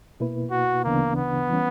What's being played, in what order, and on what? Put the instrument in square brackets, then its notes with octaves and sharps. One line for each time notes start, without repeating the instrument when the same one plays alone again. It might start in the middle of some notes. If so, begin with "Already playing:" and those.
[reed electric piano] B2 A#3 E4 B4
[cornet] F#4
[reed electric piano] D2 C#3 E3 B3 D4 [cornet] A#3
[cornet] B3
[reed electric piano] E3 G3 C#4